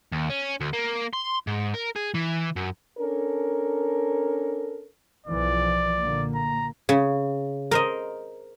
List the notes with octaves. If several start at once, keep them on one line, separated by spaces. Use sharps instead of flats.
D#2
C#4
D2
A#3
C6
G#2
A#4
G#4
E3
F#2
C#4 D4 A4 A#4
B1 E3 F3 D5
A#2 D3 A#3
A#5
C#3
A#4 C5 D#5